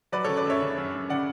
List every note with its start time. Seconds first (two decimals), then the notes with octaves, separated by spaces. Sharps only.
0.12 F#3 B4 D5
0.24 C#3 A4 C#5
0.37 B4 D5
0.46 F#2 C#5 E5
0.62 C#3
0.78 F#2
0.95 F#2
1.10 C#3 D5 F#5